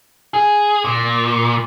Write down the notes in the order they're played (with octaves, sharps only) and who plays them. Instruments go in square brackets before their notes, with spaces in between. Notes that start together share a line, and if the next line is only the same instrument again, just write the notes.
[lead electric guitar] G#4
A#2